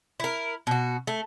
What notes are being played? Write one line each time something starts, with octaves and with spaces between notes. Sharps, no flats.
E4 A#4
B2 F#4
A3